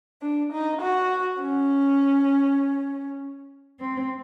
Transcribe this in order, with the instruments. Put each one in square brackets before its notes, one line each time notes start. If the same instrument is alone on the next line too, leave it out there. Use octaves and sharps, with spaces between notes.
[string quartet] D4
D#4
F#4
C#4
C4